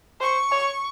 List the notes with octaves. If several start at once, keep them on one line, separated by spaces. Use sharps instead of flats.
C5 C#6
C#5